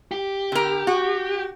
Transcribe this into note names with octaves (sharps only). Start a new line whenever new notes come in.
G4
D3 A#4
F#4